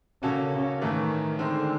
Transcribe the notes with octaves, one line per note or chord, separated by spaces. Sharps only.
C#3 A#3 C#4 F#4 A4 C#5
C#3
A2 D#3 E3 A3
D3 D#3 G#3 C4